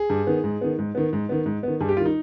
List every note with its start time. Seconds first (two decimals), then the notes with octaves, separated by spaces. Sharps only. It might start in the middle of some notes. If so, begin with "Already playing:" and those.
Already playing: G#4
0.10 G2
0.27 D#3 B3
0.44 G#2
0.61 D#3 B3
0.79 G#2
0.95 D#3 B3
1.13 G#2
1.29 D#3 B3
1.46 G#2
1.63 D#3 B3
1.81 G2 G#4
1.89 G4
1.97 G3 F4
2.00 D#3
2.06 D#4